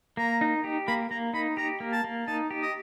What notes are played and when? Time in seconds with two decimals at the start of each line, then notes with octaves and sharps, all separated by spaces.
0.17 A#3 A#5
0.41 D#4
0.64 G4
0.88 A#3 B5
1.11 A#3 A#5
1.34 D#4 B5
1.57 G4 A#5
1.80 A#3
1.92 A5
2.04 A#3
2.27 D#4 A5
2.51 G4
2.63 D#5